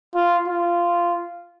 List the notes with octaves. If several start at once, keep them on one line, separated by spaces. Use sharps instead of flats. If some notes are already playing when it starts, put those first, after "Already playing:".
F4
F4